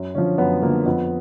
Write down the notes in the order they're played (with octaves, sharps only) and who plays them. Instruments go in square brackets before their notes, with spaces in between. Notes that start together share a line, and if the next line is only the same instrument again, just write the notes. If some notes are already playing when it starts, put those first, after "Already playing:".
Already playing: [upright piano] F#2
D3 F3 C#4
F#2 B3
D3 F3 A#3
F2 B3